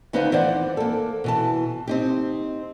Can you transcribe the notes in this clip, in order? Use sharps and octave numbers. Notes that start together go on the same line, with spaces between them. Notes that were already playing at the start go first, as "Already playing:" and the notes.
D2 B3 D#4 B4 C5 F5
F2 E3 C5 D5 F#5
A#3 A4
B2 E3 A5
C4 D#4 G4